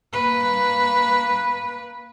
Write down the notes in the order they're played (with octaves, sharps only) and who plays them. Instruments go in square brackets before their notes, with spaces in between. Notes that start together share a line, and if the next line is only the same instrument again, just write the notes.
[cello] A#3 B4